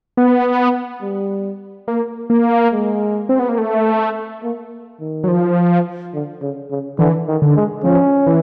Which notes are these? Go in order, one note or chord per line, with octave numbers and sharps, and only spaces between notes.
B3
G3
A#3
A#3
G#3
C4
B3
A#3
A3
A#3
D#3
F#3
F3
D3
C#3
C#3
D3 E3
D#3
D3
G#3
F3 C#4
E3